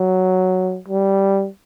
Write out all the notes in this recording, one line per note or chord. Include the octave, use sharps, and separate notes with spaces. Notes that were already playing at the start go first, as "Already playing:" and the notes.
Already playing: F#3
G3